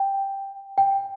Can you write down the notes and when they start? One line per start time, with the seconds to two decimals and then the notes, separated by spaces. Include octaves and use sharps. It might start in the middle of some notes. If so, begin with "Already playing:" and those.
Already playing: G5
0.78 G5